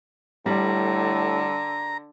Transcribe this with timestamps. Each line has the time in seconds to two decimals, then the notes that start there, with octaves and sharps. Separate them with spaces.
0.46 A2 D3 G3 A#5